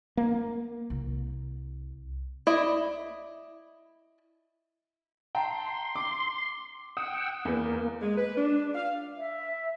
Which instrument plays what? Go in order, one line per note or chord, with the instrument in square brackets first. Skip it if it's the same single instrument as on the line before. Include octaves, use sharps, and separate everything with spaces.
[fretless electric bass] A#3
[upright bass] C2
[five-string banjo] E4 D5 D#5 B5
[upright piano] G5 A5 A#5 [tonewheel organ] C6
[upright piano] D6
[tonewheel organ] F#5 G5 E6 [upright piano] D#6
[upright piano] E2 B4 [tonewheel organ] A#3
[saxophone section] G#3
B4
D4
F5
[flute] E5